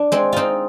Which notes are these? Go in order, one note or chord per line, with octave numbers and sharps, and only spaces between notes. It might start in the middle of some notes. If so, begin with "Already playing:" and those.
Already playing: D4
G#3 C4
C4 D#4 F4